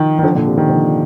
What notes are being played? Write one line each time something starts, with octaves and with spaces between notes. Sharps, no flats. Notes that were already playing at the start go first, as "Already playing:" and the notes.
Already playing: D#3 F3
D#3
D3 F3
A#2 D3
C3
C3 D#3
D3 F3